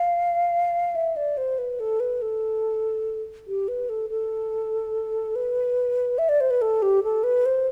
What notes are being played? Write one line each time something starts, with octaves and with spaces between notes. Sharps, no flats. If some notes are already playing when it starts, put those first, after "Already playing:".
Already playing: F5
E5
D5
C5
B4
A4
B4
A4
G4
B4
A4
A4
B4
E5
D5
C5
B4
A4
G4
A4
B4
C5